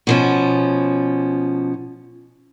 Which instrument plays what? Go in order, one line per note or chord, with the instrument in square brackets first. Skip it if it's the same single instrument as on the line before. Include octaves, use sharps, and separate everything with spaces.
[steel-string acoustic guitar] B2 F3 C#4